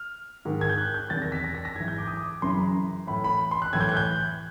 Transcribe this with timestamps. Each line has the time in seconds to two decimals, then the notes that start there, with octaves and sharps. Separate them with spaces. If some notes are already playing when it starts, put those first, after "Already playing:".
Already playing: F6
0.45 G#2 D#3
0.61 G#6
0.69 G6
0.78 F#6
0.94 G6
1.10 E2 C3 D#3 A6
1.22 A#6
1.32 B6
1.44 A#6
1.55 A#6
1.65 A#6
1.76 G#2 E3 G#6
1.88 G6
1.99 D6
2.08 D#6
2.17 D6
2.42 F#2 C#3 E3 C6
2.50 B5
2.59 A#5
3.07 A2 E3 B5
3.24 B5
3.51 C6
3.62 F#6
3.73 A2 E3 G#6
3.81 G6
3.89 F#6
3.97 G6